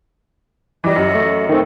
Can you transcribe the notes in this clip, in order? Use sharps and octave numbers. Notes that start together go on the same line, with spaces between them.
E3 G3 D#5
F#2
A3
D#3 A3 C4